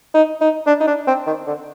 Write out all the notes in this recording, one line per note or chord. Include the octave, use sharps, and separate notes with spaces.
D#4
D#4
D4
D#4
D4
C4
D#3
D3